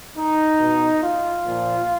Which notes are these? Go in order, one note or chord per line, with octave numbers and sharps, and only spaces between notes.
D#4
B2
F4
A#2 F3